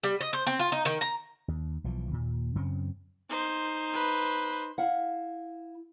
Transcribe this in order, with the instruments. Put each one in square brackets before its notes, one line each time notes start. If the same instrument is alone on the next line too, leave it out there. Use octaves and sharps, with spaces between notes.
[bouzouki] G3
D#5
C5
C4
F4
D#4
D#3
A#5
[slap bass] D#2
B1 E3 F3
D#2 A#2
F#2 C#3 C4 C#4
[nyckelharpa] D#4 C5
[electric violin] B4
[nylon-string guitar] E4 F5 F#5